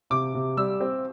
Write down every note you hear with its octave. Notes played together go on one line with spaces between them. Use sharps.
C3 D6
C3
G3 E6
C4